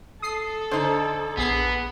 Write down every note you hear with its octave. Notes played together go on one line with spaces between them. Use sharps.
A4 D#6 C7
D3 D#4 C5
A#1 B3 G#4 C7